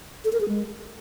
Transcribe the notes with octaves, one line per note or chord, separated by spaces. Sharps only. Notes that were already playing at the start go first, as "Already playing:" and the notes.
A4
A#4
G#4
G#3